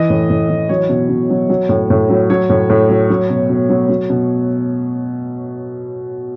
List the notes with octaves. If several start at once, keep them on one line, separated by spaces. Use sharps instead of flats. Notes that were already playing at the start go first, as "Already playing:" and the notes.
Already playing: E3 D#5
A2
A2
E3
F#3 C#5
B2
B2
F#3
F#3
A2
A2
F#3
F#3 C#5
A2
A2
F#3
F#3
B2
B2
F#3
F#3
B2